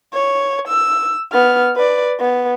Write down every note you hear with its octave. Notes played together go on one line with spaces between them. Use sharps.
C#5
E6
B3 F6
B4 D5
B3